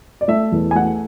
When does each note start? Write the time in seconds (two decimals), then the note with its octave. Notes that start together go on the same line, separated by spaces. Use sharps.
0.21 D5
0.28 A3 E5
0.52 E2
0.71 G#5
0.75 A3 F#5